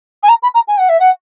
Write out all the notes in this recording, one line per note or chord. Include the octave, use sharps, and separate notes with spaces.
G#5
A#5
B5
A#5
G#5
F#5
E5
F#5